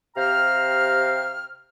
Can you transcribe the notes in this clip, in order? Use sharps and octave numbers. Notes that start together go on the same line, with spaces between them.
C3 G4 C5 F5 A#5 F6